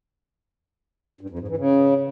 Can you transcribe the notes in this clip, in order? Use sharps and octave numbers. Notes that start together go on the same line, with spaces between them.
G2
F2
G#2
E3
C#3